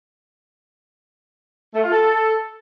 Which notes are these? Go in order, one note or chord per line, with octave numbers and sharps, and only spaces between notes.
A3
F4
A4